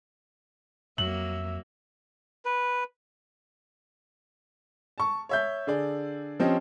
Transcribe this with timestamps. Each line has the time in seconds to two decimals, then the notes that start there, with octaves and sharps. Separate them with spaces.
0.98 F2 F#3 A#3 E5 F#7
2.45 B4
4.98 A5 C#6
5.29 C#5 E5 G6
5.67 D3 G#4 D5
6.40 F3 C4 C#4 G4 D#5